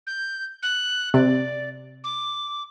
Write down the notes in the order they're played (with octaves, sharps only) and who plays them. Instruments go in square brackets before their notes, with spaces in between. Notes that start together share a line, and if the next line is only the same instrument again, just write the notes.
[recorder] G6
F#6
[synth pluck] C3 [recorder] D5
[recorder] D6